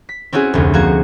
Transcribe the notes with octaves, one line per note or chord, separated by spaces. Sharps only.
B6
C4 C#4 E4 F#4 G#4
F1 D2
F3 A#3 F#4 G#6